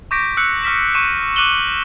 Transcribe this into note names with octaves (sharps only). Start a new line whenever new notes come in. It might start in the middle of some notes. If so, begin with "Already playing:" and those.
C#6 D6 G6 A#6 B6 D7
E6 F#6 C#7
C#6 F6 B6 E7
C#6 C#7 D#7 E7
D6 F#6 D#7 E7 F#7 G7